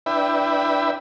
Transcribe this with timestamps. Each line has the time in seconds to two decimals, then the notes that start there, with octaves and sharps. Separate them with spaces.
0.06 D4 E4 B4 E5 G5 B5